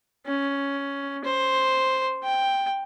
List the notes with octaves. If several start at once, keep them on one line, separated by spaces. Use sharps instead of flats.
C#4
C5
G5